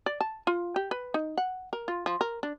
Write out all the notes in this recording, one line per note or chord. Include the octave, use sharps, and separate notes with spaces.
D5
A5
F4
G4
B4
D#4
F#5
A#4
F4
F3
A#4
D4